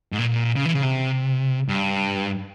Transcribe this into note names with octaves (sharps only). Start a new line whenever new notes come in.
G#2
A#2
C#3
E3
C#3
C3
G2